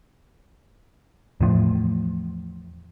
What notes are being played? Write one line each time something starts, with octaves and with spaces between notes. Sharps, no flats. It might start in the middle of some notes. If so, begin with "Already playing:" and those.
E2 A2 F3